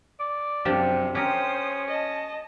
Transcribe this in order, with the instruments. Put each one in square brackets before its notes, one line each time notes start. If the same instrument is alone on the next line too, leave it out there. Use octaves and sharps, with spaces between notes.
[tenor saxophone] D5
[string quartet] F#2 C3 [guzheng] F3 D4 G4
[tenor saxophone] C#4 [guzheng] G4 A#4 [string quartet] C5 D#6
[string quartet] D#5 A5